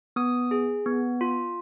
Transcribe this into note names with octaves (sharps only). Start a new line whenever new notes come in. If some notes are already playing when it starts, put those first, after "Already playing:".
B3 D#6
G#4
B3
F4